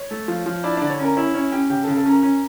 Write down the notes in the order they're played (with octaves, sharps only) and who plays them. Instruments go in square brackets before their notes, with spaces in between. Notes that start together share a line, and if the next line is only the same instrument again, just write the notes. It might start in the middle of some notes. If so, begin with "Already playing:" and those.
Already playing: [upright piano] C#5
[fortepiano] A3
F3
F3
[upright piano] D4 D5 [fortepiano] E4
[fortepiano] D3 [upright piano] D4 D5
[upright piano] C#5
[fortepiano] C#4 [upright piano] A#4
[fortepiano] E4 [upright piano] C#5
[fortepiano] C#4 [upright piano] C#5
[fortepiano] C#4 [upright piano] G4 G5
[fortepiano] C#3 [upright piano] G4 G5
[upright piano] A4 A5
[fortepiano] C#3
[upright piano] A4 A5
[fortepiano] C#4 [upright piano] A#4 A#5
[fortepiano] C#4